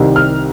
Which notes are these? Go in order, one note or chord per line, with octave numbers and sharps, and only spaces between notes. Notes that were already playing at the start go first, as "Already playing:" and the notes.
Already playing: C2 C3 D#3
F6